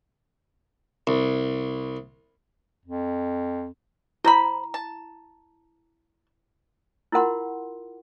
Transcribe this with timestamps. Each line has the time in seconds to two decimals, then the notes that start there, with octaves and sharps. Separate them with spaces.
1.07 C2
2.85 F2
4.24 E4 C5 A#5 B5
4.74 A5
7.12 E4 F4 A#4 F#5 C6